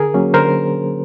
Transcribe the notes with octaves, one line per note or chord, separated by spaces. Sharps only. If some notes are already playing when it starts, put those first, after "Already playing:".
Already playing: D3 G#4 A#4
F#3 A#3 C#4
D3 A#4 C5